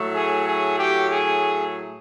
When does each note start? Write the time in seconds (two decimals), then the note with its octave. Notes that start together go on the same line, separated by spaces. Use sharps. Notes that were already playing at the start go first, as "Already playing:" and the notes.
Already playing: A2 F#3 A3
0.15 G#4
0.47 G#4
0.78 G4
1.09 G#4